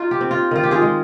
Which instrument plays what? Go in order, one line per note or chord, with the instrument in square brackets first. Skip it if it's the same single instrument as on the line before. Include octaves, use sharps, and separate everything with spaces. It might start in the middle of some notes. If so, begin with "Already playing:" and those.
Already playing: [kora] D#4 F4
G4
C4
F4
D#3 F4
G4
F4 G#4
G#3